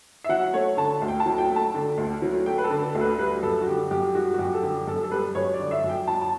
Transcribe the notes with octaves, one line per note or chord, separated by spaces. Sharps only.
E5
F#3 F#5
A3 C#5
D3 A5
D2
G5
A5
F#3
G5
A3
A5
D3
D2
F#3
A3 G5
B4
A4
D3
A4
D2
B4
G3 B4
F#2 A4
F#4
D3 G4
F#2 G4
G3 F#4
F#4
F#2 G4
A4
D3 G4
F#2 A4
A4
G3 B4
F#2 C#5
D5
D3
E5
F#2
G5
F#3 A5
A5